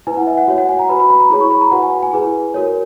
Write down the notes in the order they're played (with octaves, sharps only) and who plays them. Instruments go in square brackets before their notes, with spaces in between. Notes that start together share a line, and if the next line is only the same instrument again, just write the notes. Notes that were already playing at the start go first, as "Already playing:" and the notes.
[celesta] E4 B4 G#5
F#5
E5
F#5
F#4 C#5
F#5
G#5
A#5
F#4 B4 B5
B5
B5
A#5
E4 G#4 C#5 B5
C#6
B5
A#5
F#4 B4 F#5
G#5
G#5
E4 G#4 B4
F#4 A#4 C#5